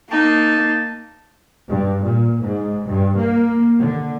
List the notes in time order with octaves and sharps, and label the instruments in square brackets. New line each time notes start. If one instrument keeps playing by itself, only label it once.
[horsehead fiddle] A#3 [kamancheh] D#4 [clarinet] A5
[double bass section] G2
A#2
G#2
G2
A#3
D3